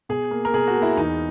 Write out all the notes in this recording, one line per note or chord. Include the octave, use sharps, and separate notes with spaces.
B2 G#4
A#3
A#4
B2 G#4
F#4
A#3
E4
E2 D#4